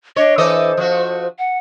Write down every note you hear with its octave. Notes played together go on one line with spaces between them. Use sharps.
D4 C#5 D#5
E3 A4 C5 D#5
F3 F#4
F#5